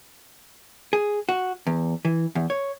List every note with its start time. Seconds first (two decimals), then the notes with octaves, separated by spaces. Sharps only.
0.93 G#4
1.29 F#4
1.67 E2
2.05 E3
2.35 E2
2.50 C#5